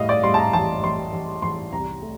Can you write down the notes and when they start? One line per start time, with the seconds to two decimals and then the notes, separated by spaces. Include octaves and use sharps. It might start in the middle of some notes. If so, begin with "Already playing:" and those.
Already playing: A2 G3 D#5 F5
0.09 D5
0.23 G3 C6
0.34 A5
0.39 A#5
0.53 A1 A5
0.83 A1 C6
1.13 A1
1.42 A1 C6
1.72 C2 A#5
2.02 A3